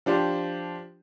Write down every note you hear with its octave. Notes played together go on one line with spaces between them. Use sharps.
F3 D4 G4 C5